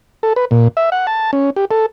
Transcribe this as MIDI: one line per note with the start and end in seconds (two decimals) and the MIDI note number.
0.23 0.33 69
0.36 0.45 71
0.51 0.68 46
0.77 0.90 76
0.92 1.06 78
1.07 1.31 81
1.33 1.50 61
1.56 1.65 67
1.71 1.86 69